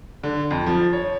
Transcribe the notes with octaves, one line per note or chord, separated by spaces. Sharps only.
D3
F2
F3
C#5